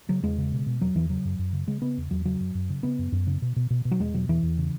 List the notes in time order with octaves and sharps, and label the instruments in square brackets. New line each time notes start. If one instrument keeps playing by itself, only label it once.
[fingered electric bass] C#3 F#3
E2 G#3
C#3
B2
B2
E2 F#3
E2 E3
C#3 F#3
F#2
F#2
C#3
C#3 G#3
C#3 B3
E2
E2 F#3
C#3 F#3
F#2
F#2
C#3
C#3 B3
F#2
F#2
C#3
B2
B2
B2
B2
F#3
E2 G#3
B2 F#3
E2 E3
E2
C#3